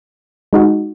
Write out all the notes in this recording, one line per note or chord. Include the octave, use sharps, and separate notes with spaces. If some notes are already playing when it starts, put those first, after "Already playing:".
G#3 D#4 F#4